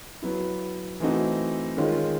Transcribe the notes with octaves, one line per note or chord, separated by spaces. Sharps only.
F#3 B3 E4
E3 A3 C4 D#4 F#4
D#3 G#3 C#4 F4